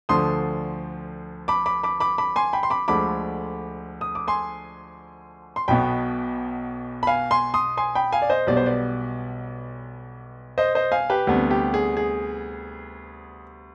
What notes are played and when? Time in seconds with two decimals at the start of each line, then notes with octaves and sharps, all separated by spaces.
0.09 D2 D3 F3 C6 D#6
1.48 B5 D6
1.66 B5 D6
1.83 B5 D6
2.00 B5 D6
2.18 B5 D6
2.36 G#5 C6
2.53 G5 B5
2.63 C6
2.70 B5 D6
2.88 D2 D3 F3 G#3 B5 D6
4.01 D#6
4.15 D6
4.28 G#5 C6
5.56 C6
5.68 B1 B2 B3 G5 B5
7.03 B5
7.07 F5 G#5
7.31 G#5 C6
7.54 C6 D#6
7.77 G#5 C6
7.95 G5 B5
8.13 F5 G#5
8.22 D5
8.30 C5 D#5
8.47 B1 B2 G3 B3 D5
8.57 C5
8.66 B4 D5
10.58 C5 D#5
10.75 C5 D#5
10.92 F5 G#5
11.10 G4 B4
11.27 D2 C3 G3 B3
11.51 G4
11.74 G#4
11.97 G#4